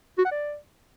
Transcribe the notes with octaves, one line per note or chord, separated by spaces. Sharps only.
F#4
F#5
D5